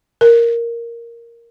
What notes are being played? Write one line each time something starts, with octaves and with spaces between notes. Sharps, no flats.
A#4